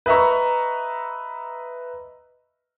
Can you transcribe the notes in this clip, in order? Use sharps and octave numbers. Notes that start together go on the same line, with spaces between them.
B4 D#5 E5 A#5 C#6